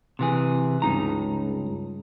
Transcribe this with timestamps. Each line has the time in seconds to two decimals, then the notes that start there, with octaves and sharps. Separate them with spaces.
0.19 C3 E3 G#4
0.82 C#2 G2 D#4 A#5